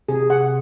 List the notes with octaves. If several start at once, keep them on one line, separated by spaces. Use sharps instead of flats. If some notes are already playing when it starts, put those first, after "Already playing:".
C3 G#4
F#5